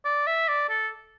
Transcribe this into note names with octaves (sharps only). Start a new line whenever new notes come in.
D5
E5
D5
A4